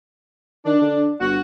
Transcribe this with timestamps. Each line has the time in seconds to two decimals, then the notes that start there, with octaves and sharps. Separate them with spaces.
0.66 D#3 D4
0.81 D3
1.20 G1 F#4